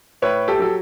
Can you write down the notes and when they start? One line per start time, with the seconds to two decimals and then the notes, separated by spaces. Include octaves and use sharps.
0.22 A2 B4 C#5
0.48 G4 A4
0.59 F#3 A4